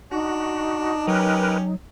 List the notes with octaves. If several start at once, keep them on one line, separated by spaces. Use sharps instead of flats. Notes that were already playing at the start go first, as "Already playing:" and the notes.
D4 D#4 F#4
F#3 C#4 G4 A#4 B4